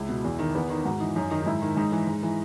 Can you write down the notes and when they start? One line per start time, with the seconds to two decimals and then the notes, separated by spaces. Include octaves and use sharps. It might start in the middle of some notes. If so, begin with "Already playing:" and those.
Already playing: C#2 E4
0.09 B2
0.24 E2
0.39 D#3
0.54 E2 B3
0.70 D#3 D#4
0.85 G#2 F#4
1.00 E3 D#4
1.15 F#2 D#4
1.31 D#3 D#4
1.41 D#4
1.46 G#2 E4
1.62 D#3
1.77 G#2 D#4
1.92 E3
2.07 G#2
2.23 E3